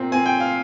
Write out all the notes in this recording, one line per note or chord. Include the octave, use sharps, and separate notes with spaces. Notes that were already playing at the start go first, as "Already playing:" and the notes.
Already playing: A#2 C4
C4 G#5
G5
F5